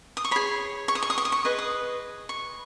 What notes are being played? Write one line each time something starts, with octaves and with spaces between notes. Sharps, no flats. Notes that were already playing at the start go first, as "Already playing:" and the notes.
D#6
C#6
G#4 C#5 B5
C#6
D#6
C#6
D#6
C#6
D#6
C#6
G#4 B4 D#5
D#6
C#6